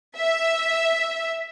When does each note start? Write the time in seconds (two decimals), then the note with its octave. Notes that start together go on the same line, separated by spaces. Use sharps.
0.17 E5